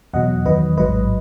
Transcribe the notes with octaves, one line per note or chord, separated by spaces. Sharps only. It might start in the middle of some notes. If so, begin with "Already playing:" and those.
E2 B2 F#3 D#5 F#5
E2 D#3 F#3 B4 D#5
A1 G#2 F#3 B4 D#5